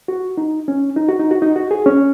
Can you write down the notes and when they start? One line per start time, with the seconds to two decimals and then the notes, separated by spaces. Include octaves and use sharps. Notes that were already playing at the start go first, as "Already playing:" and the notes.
0.08 F#4
0.38 D#4
0.68 C#4
0.96 D#4
1.09 F#4
1.19 D#4
1.31 F#4
1.42 D#4
1.56 F#4
1.71 G#4
1.86 C#4